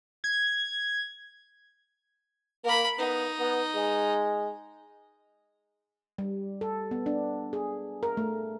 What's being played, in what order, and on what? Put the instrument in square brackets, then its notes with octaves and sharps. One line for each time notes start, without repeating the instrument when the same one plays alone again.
[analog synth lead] G#6
[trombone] A#3 [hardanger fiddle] A#4 B5
[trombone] B3 [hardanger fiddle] D#4
[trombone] B3
G#3
[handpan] G3
A4
B3
D4
G#4
A#4
A3